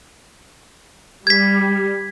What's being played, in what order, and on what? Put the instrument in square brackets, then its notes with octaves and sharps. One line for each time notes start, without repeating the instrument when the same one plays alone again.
[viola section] G3 [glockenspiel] G#6 B6